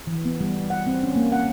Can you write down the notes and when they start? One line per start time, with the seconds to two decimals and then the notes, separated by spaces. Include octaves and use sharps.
0.07 E3
0.25 B3
0.41 G3
0.70 F#5
0.87 C4
1.03 C#4
1.16 A#3
1.32 F#5